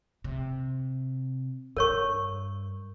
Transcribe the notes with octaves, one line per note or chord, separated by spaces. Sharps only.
C3
G2 A#4 C#5 C#6